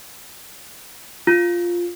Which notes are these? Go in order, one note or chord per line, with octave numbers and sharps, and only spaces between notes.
F4